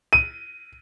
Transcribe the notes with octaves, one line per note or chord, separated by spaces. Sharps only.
D#7